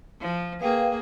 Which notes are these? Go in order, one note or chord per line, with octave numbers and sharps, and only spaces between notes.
F3
A#3 G#4 B4 F5 G5